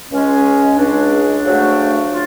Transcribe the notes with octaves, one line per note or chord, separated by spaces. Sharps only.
C#2 C#3 G#3 C#4
C#2 C#3 G#3 D4
D2 C#3 F#3 A3
F4